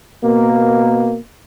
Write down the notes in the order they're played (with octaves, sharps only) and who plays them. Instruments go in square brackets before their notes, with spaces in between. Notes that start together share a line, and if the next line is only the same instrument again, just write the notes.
[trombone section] B2 A#3